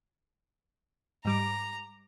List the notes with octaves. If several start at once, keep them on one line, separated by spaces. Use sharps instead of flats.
G#2 G3 A#5 D6